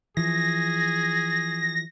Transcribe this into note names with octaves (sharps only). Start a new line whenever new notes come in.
E3 F3 G#4 A#6